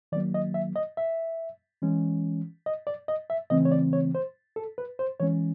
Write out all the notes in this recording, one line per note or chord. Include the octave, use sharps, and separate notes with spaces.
D#3 F#3 A#3 D5
D#5
E5
D#5
E5
E3 G#3 C#4
D#5
D5
D#5
E5
C#3 E3 A3 C4 D#5
C#5
D5
C#5
C5
A4
B4
C5
E3 G#3 C#4 C#5